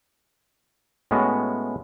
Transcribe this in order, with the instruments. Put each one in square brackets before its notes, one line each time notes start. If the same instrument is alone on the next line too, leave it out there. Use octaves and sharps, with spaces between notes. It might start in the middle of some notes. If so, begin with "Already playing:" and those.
[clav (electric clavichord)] A2 G#3 B3 C#4 F#4